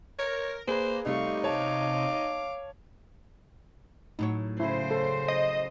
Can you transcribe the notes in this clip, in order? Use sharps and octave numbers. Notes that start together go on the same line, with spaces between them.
A#4 C#5
A#3 G#4 B4 C5
C3 G3 A3 D#4 F5 C#6
C#5 F5 A5 D6
A2 F#3 D#4 C#5
C#3 E4 C5
A4
D#5